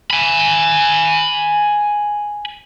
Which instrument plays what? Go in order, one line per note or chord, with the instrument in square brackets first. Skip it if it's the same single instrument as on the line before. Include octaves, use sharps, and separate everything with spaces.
[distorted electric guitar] G#5 B5